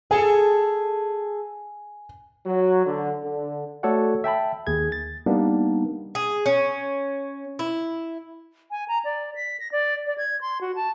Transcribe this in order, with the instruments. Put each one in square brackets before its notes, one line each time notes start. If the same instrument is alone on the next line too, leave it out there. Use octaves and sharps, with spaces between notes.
[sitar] G#4 A4 [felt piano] G#5
[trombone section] F#3
D3
D3
[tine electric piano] A3 F#4 A4 C#5 D5 F#5
E5 G5 A5 B5
D#2 G#4 G#6
A6
G3 A#3 B3 D4 D#4
[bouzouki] G#4
C#4
E4
[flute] G#5
A#5
D5
B6
A#6
D5
D5
G#6
C6
F#4
A5